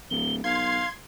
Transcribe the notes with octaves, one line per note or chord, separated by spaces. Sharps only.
D1 G7
B1 F5 C6 G#6